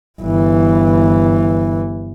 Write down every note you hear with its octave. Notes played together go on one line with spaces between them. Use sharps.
G1 E3